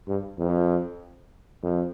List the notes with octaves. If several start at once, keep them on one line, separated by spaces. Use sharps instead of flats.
G2
F2
F2